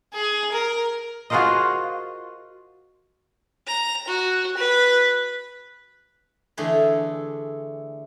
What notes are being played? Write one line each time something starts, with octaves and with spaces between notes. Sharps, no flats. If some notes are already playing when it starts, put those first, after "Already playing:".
G#4
A#4
F4 F#4 G#4 A#4 C5 D#5
A#5
F#4
B4
D3 E3 A3 G#4